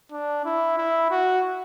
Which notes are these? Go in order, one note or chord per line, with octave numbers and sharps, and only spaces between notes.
D4
E4
E4
F#4